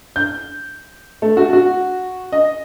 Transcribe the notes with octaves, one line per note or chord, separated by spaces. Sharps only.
G6
A3
F#4
F#4
D#5